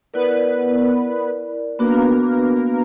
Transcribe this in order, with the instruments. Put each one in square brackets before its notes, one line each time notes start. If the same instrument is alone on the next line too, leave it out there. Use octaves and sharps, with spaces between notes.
[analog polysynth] B3 B4 [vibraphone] E4 A#4 D5
[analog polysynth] A#3 A#4 [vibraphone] B3 D4 F#4 B4